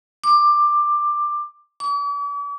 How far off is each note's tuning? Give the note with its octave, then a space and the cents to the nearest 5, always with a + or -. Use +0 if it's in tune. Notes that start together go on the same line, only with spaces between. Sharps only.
D6 +15
D6 -45